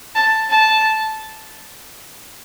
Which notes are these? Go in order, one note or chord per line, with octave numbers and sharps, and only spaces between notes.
A5
A5